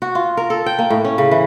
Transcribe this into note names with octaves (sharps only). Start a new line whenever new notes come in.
F#4
F4
A#4
A4
G5
A#3
A2
C#4
C#3
E3